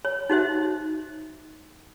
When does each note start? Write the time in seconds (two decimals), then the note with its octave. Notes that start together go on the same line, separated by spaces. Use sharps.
0.05 C#5
0.30 D#4 F#4 C5 E5